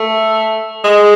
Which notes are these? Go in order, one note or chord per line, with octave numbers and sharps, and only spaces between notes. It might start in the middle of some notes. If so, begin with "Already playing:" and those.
Already playing: A3
G#3